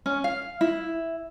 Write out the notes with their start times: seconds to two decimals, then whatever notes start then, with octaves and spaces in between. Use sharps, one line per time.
0.06 C#4
0.24 F5
0.61 E4